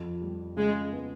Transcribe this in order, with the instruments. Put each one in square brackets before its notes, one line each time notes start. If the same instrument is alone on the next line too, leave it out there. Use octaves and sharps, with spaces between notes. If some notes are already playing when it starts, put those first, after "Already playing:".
Already playing: [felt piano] F2
G3
[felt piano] C#3 [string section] G#3
[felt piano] B3